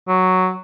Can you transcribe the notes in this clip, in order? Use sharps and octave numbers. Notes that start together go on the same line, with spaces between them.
F#3